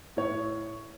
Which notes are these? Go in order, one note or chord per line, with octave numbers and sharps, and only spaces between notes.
A2 C#5